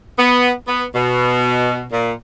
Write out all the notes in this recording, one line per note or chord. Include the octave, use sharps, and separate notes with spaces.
B3
B3
B2
A#2